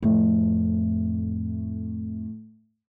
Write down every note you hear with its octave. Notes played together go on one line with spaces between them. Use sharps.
F2 A2 A3